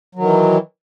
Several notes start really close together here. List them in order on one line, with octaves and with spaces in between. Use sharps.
F#3 D#3 E3